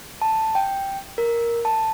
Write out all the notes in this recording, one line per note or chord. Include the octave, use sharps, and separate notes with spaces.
A5
G5
A#4
A5